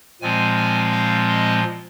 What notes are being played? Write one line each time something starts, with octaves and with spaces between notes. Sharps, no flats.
A#2 F3 G#3 C4 G#5
G#5
F5
D#5